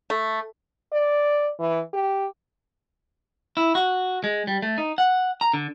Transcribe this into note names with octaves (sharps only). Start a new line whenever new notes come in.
A3
D5
E3
G4
E4
F#4
G#3
G3
A3
D#4
F#5
A#5
D3